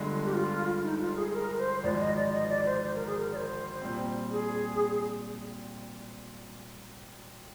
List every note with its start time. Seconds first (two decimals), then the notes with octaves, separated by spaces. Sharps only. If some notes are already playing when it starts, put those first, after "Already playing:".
Already playing: G1 G2 D3 G#3
0.25 G4
0.33 F4
0.83 D#4
1.00 F4
1.16 G#4
1.34 A#4
1.58 C5
1.83 G#1 G#2 F3 G#3 D5
2.00 D#5
2.16 D5
2.32 D#5
2.49 D5
2.66 C5
2.83 C5
2.95 A#4
3.06 G#4
3.19 A#4
3.32 D5
3.37 C5
3.82 A#2 G3 C4
4.31 G#4